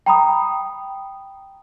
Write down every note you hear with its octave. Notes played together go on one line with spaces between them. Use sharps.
G5 A#5 B5 D#6